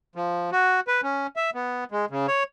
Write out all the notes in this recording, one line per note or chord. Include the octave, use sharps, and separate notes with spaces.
F3
F#4
B4
C#4
E5
B3
G#3
C#3
C#5